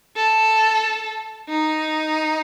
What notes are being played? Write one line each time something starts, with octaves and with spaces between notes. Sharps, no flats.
A4
D#4